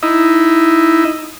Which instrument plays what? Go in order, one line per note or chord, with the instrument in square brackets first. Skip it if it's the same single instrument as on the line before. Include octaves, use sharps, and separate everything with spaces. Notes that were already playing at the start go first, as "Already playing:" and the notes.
[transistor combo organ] D#4 E4